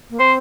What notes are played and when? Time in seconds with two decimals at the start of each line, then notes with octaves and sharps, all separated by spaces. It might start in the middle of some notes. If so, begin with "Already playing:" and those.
0.10 A#3
0.19 C4 C5